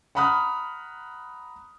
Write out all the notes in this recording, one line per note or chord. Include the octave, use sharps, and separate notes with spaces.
F#5 A#5 B5 D#6 F6 F#6